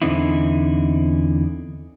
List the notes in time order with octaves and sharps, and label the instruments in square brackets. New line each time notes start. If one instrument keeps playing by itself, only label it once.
[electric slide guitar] E2 D3 C4 D#4 E4